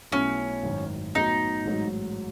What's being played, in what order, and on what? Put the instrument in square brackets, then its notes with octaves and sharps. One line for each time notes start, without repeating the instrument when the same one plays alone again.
[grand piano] B1 B2 A3 E4 A4 [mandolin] C#4
[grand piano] G#1 F#2 D#3 F#3
[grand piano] A2 F#3 B3 F#4 [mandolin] D#4
[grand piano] A1 G#2 F#3